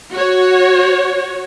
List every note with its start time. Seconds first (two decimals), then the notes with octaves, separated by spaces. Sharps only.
0.12 F#4 C#5